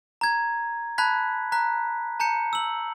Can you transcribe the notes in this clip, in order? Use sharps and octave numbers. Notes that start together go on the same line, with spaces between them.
A#5 G#6
A5 B5 F#6 G#6 B6
A#5 F#6 B6
A5 A#5 G6 C#7
E6 F#7